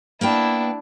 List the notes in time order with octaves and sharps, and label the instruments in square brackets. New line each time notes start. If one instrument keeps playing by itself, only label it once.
[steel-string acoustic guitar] A#3 B3 G5 [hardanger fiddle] D4 E4